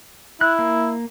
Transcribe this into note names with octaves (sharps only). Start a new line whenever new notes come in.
E4 F#6
A#3